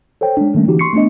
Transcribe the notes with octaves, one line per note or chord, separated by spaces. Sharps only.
A4 C5 C#5 G5
G#3 D4
D#3 G3 A3 A#3 C#4
D3 E3 D#4 F#4 G4
C6 C#6 C7 C#7
A3 B3 D4 D#5